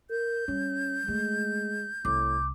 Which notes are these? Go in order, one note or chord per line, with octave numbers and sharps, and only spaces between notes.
A#4 G6
G3 C#4
G#3 A3
C2 A2 D6